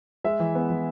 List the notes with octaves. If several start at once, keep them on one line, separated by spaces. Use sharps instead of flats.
G#3 E5
E3
B3
E3